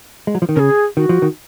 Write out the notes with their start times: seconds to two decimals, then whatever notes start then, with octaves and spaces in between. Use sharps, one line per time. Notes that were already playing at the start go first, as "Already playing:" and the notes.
0.27 G#3
0.35 F#3
0.42 F3
0.49 D#3
0.56 C#3 G#4 A#4
0.97 D#3 F#4
1.09 F3
1.22 D#3